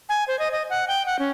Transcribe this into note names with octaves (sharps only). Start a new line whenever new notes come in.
G#5
C5
D#5
D#5
F#5
G5
F#5
C#4